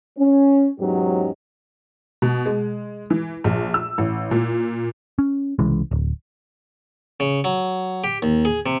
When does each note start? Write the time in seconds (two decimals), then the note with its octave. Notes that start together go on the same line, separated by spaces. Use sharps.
0.17 C#4
0.80 E2 G#2 F#3 C#4 D#4 G4
2.22 B2
2.46 G#3
3.10 E3
3.44 A#1
3.74 E6
3.98 A1
4.31 A#2
5.19 C#4
5.59 C2 C#3 E3 G#3
5.91 D1
7.20 C#3
7.44 F#3
8.04 G4
8.22 D#2
8.45 G#4
8.66 C3